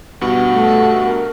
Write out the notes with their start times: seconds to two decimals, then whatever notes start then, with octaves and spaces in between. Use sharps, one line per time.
0.21 G2 B2 F#4
0.52 A3
1.05 A#4